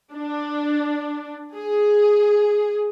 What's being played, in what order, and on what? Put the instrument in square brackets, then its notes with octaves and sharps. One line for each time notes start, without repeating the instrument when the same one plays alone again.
[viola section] D4
G#4